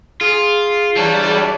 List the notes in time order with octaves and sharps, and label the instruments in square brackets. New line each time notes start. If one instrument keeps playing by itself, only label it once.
[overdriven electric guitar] F4 [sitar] G#4
[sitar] G2 E3 [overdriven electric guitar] G3 [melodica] D4 C#5 A5
[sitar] F#2 E3 G#3